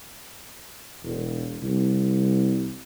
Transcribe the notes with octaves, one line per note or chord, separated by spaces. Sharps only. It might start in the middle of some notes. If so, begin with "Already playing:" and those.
E1
C2